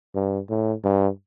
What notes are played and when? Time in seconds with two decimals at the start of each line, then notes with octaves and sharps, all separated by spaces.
0.15 G2
0.49 A2
0.84 G2